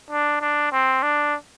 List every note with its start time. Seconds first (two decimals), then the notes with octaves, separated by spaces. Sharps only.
0.11 D4
0.41 D4
0.72 C4
1.03 D4